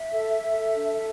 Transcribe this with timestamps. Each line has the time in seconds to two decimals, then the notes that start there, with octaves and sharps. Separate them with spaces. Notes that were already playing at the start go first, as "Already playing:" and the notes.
Already playing: E5
0.12 A4
0.42 A4
0.73 D4
0.93 E5